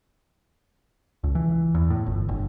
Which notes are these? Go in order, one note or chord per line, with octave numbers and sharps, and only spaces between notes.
C#2
E3
E2
A2
G1
G1